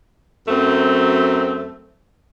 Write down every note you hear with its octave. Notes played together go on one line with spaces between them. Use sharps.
F#2 F#3 A3 C4